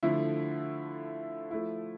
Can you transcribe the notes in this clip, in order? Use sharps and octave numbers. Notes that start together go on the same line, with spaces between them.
D3 F3 A3 E4
F3 A3 E4